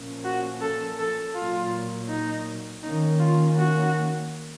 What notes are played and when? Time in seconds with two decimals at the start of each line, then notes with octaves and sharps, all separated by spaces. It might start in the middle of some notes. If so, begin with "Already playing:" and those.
Already playing: A#2 F3 A#3 C#4
0.25 F#4
0.61 A4
1.00 A4
1.35 A#2 F#3 A#3 F4
2.09 D#4
2.83 D#3 A#3 C#4 D#4
3.20 F4
3.56 F#4